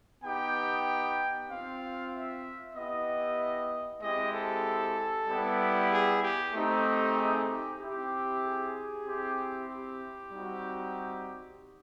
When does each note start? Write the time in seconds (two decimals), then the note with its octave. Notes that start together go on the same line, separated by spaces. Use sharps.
0.24 B3 D#4 G4 G5
1.49 C4 F4 F5
2.13 E5
2.75 B3 E4 G4 D#5
4.02 G#3 C4 E4 G4 D#5
4.33 A4
5.28 G3 B3 E4 G4
5.91 G#4
6.23 G4
6.54 A3 C4 D#4 G4
7.16 G#4
7.48 G4
7.80 C4 E4 G4
8.43 G#4
9.06 C4 E4 G4
9.69 G4
10.31 G3 C4 D#4 F#4